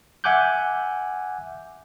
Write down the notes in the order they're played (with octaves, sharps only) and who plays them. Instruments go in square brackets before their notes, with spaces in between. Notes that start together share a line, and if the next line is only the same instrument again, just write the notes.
[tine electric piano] E5 F#5 G#5 D6 F#6 G6